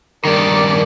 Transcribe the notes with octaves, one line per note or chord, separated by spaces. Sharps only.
G2 D#3 A#4 D5